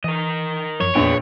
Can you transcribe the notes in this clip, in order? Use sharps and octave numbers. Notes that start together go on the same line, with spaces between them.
E3 A#4 D#5
F#2 F3 C#5
A#1 E2 B3 G#4 B4 G5